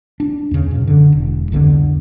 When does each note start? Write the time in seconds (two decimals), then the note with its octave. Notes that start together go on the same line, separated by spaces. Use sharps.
0.20 D4
0.51 E2 C#3
0.71 F#2 B2
0.87 D3
1.12 E1
1.52 C2 F2 D3 B3